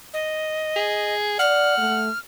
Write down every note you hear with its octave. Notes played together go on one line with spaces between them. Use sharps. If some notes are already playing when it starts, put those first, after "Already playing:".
D#5
G#4
D5 F#5 F6
A3